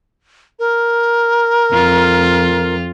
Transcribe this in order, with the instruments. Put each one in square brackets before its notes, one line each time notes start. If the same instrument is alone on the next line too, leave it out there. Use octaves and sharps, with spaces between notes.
[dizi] A#4
[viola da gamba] F2 F4